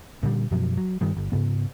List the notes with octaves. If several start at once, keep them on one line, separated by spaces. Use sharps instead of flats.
A#2 D3 G3
F#2 B2 F3 F#3
F#3
G2 D#3 G3
G1
G#2 C#3 B3